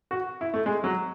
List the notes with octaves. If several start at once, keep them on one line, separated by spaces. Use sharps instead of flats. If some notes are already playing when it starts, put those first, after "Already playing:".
F#4
E4
A3
G#3
F#3